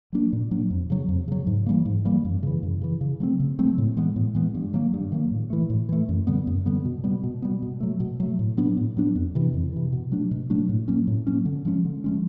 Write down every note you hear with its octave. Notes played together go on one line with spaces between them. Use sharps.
F#3 A#3 D4
A#2
F#3 A#3 D4
F2
C#3 F#3
F2
C#3 F#3
G#2
E3 G3 A#3
G#2
E3 G3 A#3
F#2
C#3 E3
F#2
C#3 E3
C#3
F#3 A3 C4
C#3
F#3 A3 C4
A2
E3 G#3 B3
A2
E3 G#3 B3
G2
D#3 F#3 A#3
G2
D#3 F#3 A#3
A2
E3 A3
A2
E3 A3
F#2
D3 G3 B3
F#2
D3 G3 B3
B2
G3 B3
B2
G3 B3
B2
F#3 A3
B2
F#3 A3
A2
F#3 B3 D4
A2
F#3 B3 D4
F2
C3 E3
F2
C3 E3
B2
F#3 A3 D4
B2
F#3 A3 D4
A2
F#3 A#3 C#4
A2
F#3 A#3 C#4
D3
F3 G#3 C#4
D3
F3 G#3 C#4